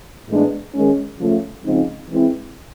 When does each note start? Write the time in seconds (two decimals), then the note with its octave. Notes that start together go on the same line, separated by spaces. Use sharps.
0.28 A2 E3 G#3 B3 D4
0.74 D#3 G#3 C#4
1.19 C#3 F3 A3
1.64 C#3 F3 G#3 C4 D#4
2.09 E3 G#3 C4 E4